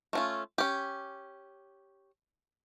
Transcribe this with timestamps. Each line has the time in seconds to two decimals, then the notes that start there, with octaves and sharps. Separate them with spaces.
0.13 A3 C#4 F4
0.58 C#4 G4